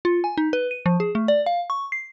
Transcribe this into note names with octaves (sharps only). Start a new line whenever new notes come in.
F4
G#5
D#4
B4
D#7
F3
G#4
A3
D5
F5
C#6
C7